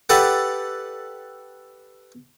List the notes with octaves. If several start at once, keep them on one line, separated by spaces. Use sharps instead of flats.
G4 A4 B4 D5 F#5